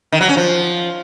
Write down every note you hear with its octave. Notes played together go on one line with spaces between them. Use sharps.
D#3
F#3
C#4
F3